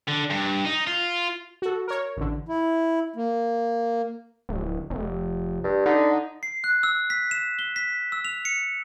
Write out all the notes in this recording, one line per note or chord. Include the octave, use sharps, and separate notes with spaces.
D3
G2
D#4
F4
F#4 A4
A#4 C#5
A1 D3
E4
A#3
D1
F1
G2
D3 D#4
C7
F#6
E6
B6
E7
G7
B6
E6
F7
C#7